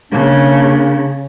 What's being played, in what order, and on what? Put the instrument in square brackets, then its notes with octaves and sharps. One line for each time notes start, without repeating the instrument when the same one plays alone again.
[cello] C#3 [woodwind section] A#3 D4